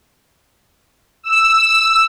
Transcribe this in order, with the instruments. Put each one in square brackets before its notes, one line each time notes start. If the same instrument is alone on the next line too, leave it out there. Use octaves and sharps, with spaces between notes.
[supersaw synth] E6